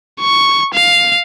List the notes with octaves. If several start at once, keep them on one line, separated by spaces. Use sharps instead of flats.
C#6
F5